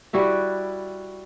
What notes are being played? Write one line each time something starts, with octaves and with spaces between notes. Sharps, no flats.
G3 E4 F#4 E5